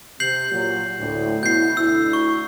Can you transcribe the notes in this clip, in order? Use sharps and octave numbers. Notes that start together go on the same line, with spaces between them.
C3 G6 C7 F#7
A#2 F#3
D2 A2
B2 E4 G6 C7
D2 E4 E6
C#6